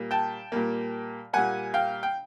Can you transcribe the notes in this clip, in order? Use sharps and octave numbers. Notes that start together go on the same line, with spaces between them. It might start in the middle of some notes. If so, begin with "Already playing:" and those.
Already playing: A#2 G3 A#3
G5 A5
A#2 G3 A#3
A#2 G3 A#3 F#5 G#5
F5 G5
G5